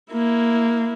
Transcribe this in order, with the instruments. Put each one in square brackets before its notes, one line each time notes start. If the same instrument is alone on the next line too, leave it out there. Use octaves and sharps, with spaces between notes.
[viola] A#3 E4